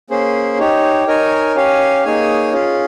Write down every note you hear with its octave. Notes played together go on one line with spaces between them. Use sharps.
A#3 C#4 G#4 C5
D#4 G4 C#5
D#4 A#4 C#5 G#5
C#4 G4 C#5 F5 G#5
A#3 D#4 G#4 C#5 G#5
C#4 F4 G#4